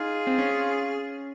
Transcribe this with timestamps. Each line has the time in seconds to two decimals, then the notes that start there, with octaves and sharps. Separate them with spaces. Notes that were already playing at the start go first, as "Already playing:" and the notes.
Already playing: D#4 F4 G#4
0.27 C4
0.38 C#4